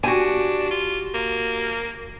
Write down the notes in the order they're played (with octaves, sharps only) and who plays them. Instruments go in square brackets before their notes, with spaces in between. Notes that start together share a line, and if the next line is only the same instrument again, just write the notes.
[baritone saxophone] D4 [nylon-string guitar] F#4 G4 G#5
[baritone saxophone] F4
A#3